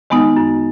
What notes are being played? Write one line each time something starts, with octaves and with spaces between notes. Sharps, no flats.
D#3 G#3 B3 D#4
F#2